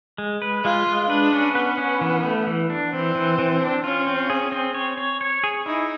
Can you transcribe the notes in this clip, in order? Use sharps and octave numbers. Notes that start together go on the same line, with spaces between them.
G#3
B4
G#3 F4
G#3
D4 B4
C#4
B3 B4
C#4
E3
A3
E3
D4
E3 C4
E3
E3
D4
C#4 F4
C4
G#4
C4
C#5
C#5
C#5
G#4
D#4 E4